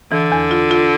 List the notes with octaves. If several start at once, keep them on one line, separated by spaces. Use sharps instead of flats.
D3 E3
E2
F4
F4